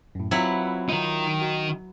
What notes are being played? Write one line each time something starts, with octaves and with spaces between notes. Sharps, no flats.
F#2 A2
F#3 C4 E4 F4 B4
D#3 D#4 F4
F#4